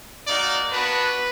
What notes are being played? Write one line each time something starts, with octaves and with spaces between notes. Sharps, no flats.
A#3 D#4 F#4 D5
B3 D4 F#4 B4